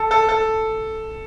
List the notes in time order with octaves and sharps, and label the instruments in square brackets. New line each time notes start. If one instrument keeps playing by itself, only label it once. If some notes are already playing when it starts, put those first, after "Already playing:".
Already playing: [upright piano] A4
A4
A4